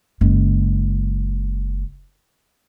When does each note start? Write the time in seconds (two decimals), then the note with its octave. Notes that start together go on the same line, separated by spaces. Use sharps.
0.21 F#1 G#3